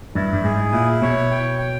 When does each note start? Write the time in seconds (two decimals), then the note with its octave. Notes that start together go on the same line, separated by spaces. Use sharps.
0.15 G2 E4
0.33 G2
0.44 G#2 G#4
0.72 A#2 E4
1.02 B2 C#5
1.31 G5
1.59 G5